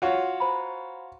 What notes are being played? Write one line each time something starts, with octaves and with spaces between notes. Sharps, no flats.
F4 F#4 C#5
C5 A#5 B5